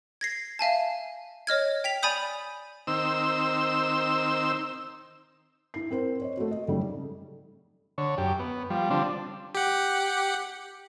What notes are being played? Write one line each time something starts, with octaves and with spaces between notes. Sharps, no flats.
G#6 A#6 C7
E5 F5 G#5 A5
C#5 D#5 F6 G#6
G5 B6 F7
D5 G#5 B5 D#6 G6
D#3 C4 E6
E4 C7
C4 A#4 C5
C#5 D#5
A3 F#4
D#5
F#2 C#3 G3 A3 D#4
D3 C#5
F#2 G4
B3
F3 G3
D3 F3 G3 C4 D4
G4 F#5